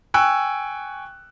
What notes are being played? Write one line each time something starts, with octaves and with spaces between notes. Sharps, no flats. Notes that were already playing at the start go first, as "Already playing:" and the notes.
G5 G#5 C#6 E6 F#6